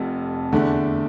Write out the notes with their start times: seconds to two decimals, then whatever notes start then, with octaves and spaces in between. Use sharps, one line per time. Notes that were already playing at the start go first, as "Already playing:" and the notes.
Already playing: F1 F2 C3
0.52 E2 D3 A3 D4